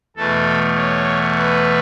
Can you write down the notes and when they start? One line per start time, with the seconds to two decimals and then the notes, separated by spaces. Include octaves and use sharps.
0.17 E2 B2 A3 A4
0.77 C#5
1.38 B4